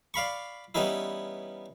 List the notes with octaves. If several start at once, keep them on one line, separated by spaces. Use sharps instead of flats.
D5 F5 B5 C#6
E3 G3 B3 C#4 D#4 E4